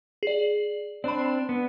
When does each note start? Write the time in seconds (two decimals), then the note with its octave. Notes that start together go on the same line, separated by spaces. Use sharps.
0.23 G#4 D5
1.04 C4 D4 D5 B5
1.49 B3